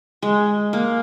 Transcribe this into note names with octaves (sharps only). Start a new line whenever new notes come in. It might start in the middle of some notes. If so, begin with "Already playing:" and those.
G#3
A#3